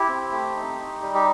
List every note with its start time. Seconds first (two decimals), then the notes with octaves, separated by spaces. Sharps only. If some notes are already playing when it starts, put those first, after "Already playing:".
Already playing: E4 G4
0.09 C4
0.32 A3
0.56 D#4
0.78 D#4
1.02 G3
1.14 G4